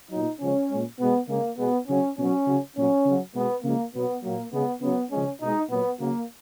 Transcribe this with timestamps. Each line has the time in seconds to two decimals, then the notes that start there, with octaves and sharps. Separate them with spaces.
0.11 A#2 F#3 D#4
0.40 C#3 F3 G#3 C#4
0.70 A#2 G#3
0.99 B2 G#3 B3
1.29 C#3 G#3 A#3
1.58 B2 G#3 B3
1.88 C#3 F#3 C#4
2.17 B2 F#3 C#4
2.47 C#3 F#3
2.76 A#2 F#3 C#4
3.06 C#3 F#3
3.35 B2 G#3 B3
3.64 C#3 F3 G#3 A#3
3.94 B2 F#3 B3
4.24 A#2 F#3 A#3
4.53 C#3 G#3 B3
4.82 C#3 F#3 B3
5.12 C#3 F3 G#3 C#4
5.41 B2 G#3 D#4
5.70 A#2 F#3 B3
6.00 C#3 F#3 A#3